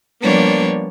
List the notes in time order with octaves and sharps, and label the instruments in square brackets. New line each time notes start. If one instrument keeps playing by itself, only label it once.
[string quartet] F3 G3 A#3 B3 D4 C#5